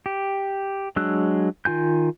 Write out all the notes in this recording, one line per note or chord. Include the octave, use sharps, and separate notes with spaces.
G4
F#3 G#3 D4 E6 F#6
D#3 F4 G#5 G6